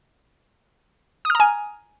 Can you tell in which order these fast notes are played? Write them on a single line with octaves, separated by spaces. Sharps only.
D#6 F6 A#5 G#5